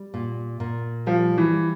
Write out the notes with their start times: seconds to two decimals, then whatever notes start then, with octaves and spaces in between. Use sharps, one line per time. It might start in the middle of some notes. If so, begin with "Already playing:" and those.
Already playing: G3
0.14 A#2
0.60 A#2
1.06 F3 G3
1.38 E3
1.53 G3